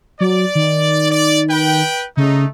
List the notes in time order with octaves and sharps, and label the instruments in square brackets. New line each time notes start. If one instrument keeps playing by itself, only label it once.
[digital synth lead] F#3 [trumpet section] D5
[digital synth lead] D#3
[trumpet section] D5
B4 G5
[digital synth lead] C#3 [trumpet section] A3 D#4